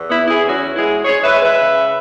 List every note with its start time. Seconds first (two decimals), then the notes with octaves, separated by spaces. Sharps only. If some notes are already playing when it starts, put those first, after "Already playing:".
Already playing: E2
0.09 B3 E4
0.19 E3
0.28 E4 G#4
0.47 E2 C#4 F#4
0.76 G#3 E4 G#4
1.04 G#3 G#4 C#5
1.24 B4 E5
1.33 G#3
1.42 B4 E5
1.61 C#3